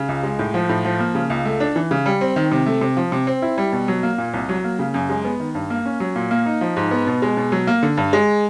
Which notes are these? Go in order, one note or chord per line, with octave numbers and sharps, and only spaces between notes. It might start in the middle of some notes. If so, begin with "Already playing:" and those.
Already playing: C#3
C#2
G#3
A2
F3
A2
F3
A#3
C#3
C#2
A3
D4
E3
C#3
G3
C4
D#3
C3
A3
C3
F3
C3
C4
E4
G3
B2
F#3
A#3
A#2
C2
F#3
A#3
C#3
F#2
G#3
B3
D#3
G2
A#3
C#4
F#3
A#2
A#3
D#4
F3
G#2
B3
B2
G#3
B2
F#3
A#3
D3
G2
G#3